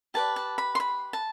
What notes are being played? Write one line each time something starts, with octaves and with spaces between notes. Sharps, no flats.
G4 B4 D5 A5
A5
B5
C6
B5
A5